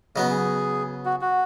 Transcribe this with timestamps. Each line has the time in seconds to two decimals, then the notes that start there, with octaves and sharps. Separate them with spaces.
0.15 C#3 F#3 B3 D#5
0.30 G#4
1.05 F#4
1.21 F#4